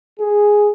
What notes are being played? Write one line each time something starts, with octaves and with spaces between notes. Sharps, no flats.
G#4